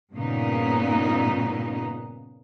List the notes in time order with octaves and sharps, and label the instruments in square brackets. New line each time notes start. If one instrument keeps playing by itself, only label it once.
[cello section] G2 A#2 C#3 B3 D#4